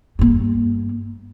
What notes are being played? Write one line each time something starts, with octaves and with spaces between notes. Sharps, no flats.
G2 A#3